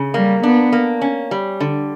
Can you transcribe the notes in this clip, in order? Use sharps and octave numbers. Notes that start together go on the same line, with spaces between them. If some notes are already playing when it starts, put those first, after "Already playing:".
Already playing: C#3
G3 A#3
B3 D4
A#3
C#4
G3
D3